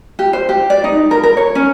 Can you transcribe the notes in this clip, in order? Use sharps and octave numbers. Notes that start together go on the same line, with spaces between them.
G4
C5
G4
D5
D#4
A#4
A#4
C#5
C#4